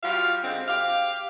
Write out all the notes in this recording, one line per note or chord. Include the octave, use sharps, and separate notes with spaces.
G3 F4 F#4 F5
D3 G#3 C4
G4 F5